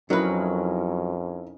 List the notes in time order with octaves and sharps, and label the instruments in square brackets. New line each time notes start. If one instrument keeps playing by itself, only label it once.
[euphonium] F2 [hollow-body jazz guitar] F#3 B4 [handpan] C#4 D#4 D#5 [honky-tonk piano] E4 A#4